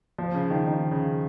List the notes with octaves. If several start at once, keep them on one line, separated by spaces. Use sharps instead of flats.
F3
C#3
D#3
D#3
C#3